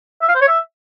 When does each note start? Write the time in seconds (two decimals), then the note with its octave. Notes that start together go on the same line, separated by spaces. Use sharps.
0.22 E5
0.28 F5
0.35 C5
0.41 C#5
0.48 E5